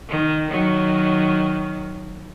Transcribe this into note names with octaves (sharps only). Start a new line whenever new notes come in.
D#3
D#3 F#3